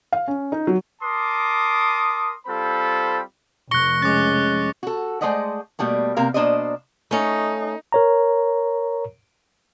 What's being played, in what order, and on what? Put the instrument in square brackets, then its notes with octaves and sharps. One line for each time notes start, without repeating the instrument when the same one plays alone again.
[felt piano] F5
C#4
D#4
F#3
[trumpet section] A#4 A5 C6 D6 D#6
G3 C4 F4 A4 C5 B5
[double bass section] F1 [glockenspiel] C#6 F#6 [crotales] A#6 C#7 G7
[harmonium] G#3 C#4 [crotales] D6 F#6 [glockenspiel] A6
[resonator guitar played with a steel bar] F#4 A4
G#3 A3 C5 D5 D#5 F#5
B2 G3 A3 A#3
C3 A#3 A#4 F5
B2 A#3 D4 C5 D5 D#5
[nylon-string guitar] A3 C#4 [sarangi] D#4
[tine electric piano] A#4 C#5 A#5